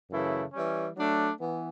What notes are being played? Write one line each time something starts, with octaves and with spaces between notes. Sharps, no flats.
F#2 C#3 E3 A3 E4
E3 G3 C#4
F#3 A3 D4
E3 B3